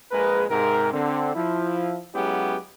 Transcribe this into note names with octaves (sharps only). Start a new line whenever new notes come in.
A#1 G#3 G#4 A#4 B4
G#2 C3 A#4
D3 C4
F3 E4
F#3 G#3 B3 C#4 E4 G4